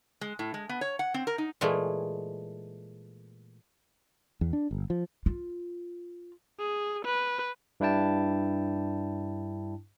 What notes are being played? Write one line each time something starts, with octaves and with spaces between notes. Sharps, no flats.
G#3
A2
G#3
B3
C#5
F#5
C4
A#4
D#4
A#2 E3 G#3 A3
E2
D4
G1
F3
F4
G#4
B4
G2 D4 E4 G5 A5